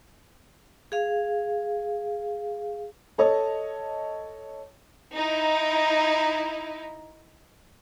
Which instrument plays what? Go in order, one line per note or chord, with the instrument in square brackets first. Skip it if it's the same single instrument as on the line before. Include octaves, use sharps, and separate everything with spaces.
[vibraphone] G#4 F5
[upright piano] A4 C#5 D#5 A5
[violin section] D#4 E4